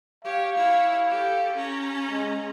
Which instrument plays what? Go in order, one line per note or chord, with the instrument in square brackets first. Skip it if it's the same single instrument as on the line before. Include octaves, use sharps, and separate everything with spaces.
[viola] G4 C#5 [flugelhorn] F5
[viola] E4 C#5
G4 A4
C#4 A#5
[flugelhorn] G#3